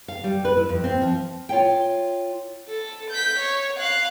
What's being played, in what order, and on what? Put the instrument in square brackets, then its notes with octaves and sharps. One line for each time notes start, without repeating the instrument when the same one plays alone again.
[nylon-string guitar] F5
G3
B4
E4
F2
C4
F3
F4 C#5 E5 G5
[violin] A4
G6 B6
C#5
F5 F#6